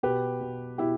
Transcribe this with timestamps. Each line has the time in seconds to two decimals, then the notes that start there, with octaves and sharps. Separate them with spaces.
0.03 B2 G4 B4
0.41 B2
0.78 B2 E4 G4